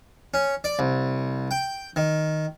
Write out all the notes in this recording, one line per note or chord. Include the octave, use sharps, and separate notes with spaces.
C#4
D5
C2
G5
D#3